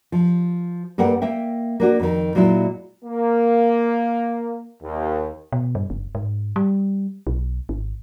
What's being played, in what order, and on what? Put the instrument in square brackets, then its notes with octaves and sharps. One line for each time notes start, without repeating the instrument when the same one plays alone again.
[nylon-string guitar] F3
G2 A#3 A4 F#5 G5
A#3 E5 G5
A#3 D4 F#4
F2 D#3
A#2 F#3 G#3 E4
[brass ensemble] A#3
D#2
[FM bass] B2
G2
F#1
G#2
G3
B1
G#1